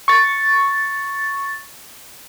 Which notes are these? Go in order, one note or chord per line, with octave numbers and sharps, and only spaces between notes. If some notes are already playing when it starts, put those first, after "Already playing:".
C#6 A6